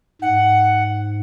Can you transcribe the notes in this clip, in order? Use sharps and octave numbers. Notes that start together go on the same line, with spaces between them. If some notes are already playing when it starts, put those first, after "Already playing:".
G#2 F#5